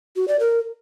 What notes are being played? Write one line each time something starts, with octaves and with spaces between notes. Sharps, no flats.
F#4
D5
A#4